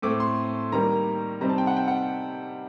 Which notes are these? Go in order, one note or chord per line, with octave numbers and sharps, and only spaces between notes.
A2 A3 C4 D6
C6
D#3 G3 A#3 A#5
C3 G3 C4 D#4 A#5
A5
G5
F#5
G5
F#5